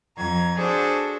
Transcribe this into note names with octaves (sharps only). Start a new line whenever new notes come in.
F2 A#5 G#6
D4 F#4 G#4 A4 C5